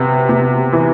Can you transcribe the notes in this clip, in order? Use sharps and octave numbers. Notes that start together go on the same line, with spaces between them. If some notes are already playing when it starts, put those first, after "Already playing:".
Already playing: C3 B3
C3
E3